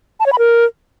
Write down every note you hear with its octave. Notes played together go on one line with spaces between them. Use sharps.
A5
C#5
B5
A#4